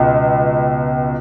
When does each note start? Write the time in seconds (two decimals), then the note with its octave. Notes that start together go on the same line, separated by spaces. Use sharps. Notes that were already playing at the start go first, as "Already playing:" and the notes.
Already playing: C#2 B2